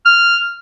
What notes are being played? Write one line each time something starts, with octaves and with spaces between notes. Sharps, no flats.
F6